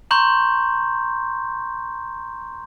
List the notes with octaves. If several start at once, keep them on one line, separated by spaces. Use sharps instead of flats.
A#5 C6 C#6 G6